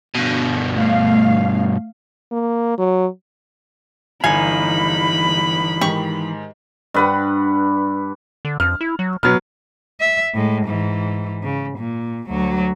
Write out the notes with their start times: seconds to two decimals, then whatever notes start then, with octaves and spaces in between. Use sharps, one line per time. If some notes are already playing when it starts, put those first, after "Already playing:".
0.15 G2 B2
0.75 A3 F5
2.32 A#3
2.78 F#3
4.24 G1 E3 D#4 F5 G#5 B5
5.81 G#2 D#3 G4 C#6
6.94 G2 B4 F#5
8.45 D3
8.60 F2 F6
8.81 E4
8.99 F#3
9.23 B2 F#3 B3 F6
10.00 E5
10.34 A2 G#3
10.66 G#2 E3
11.43 C#3
11.78 A#2
12.28 D2 F#3